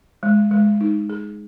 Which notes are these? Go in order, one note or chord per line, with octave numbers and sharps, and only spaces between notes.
G#3
G#3
D#4
G#4